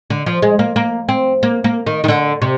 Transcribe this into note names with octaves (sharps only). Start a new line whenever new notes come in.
D3
F3
G#3
A#3
A#3
C4
A#3
A#3
D#3
D#3
D3
C3